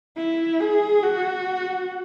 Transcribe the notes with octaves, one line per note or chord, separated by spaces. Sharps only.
E4
G#4
F#4